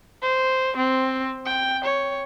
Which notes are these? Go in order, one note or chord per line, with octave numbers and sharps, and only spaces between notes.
C5
C4
G5
C#5